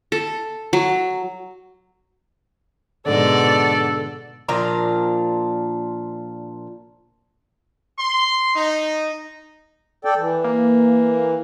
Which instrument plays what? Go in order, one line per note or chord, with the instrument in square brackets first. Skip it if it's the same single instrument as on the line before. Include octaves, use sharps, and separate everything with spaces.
[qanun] A4
F#3
[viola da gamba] G#2 B2 [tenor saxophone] D3 [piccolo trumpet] A4 [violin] D5
[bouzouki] A#2 F3 D4 A#5
[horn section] C6
D#4
[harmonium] A4 D5 G5
E3
[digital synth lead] A#3